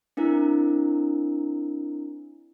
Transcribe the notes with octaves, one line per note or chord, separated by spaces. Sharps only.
C4 D4 E4 A#4